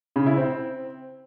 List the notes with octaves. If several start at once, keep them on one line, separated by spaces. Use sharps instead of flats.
C#3
E4
C4